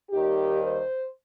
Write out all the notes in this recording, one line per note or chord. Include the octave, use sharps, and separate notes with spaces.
D#2 D#3 G3 G4
C5